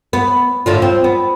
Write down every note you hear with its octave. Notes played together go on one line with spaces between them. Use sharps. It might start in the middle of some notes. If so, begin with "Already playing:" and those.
B3
A2 D3 F4
C4
B3